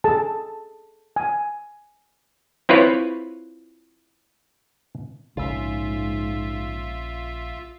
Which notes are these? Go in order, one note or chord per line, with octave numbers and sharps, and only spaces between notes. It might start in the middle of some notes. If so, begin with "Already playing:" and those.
G#4 A4 A5
G#5
C4 E4 F4 B4 C#5
A#1 G#2 C#3 F4 E5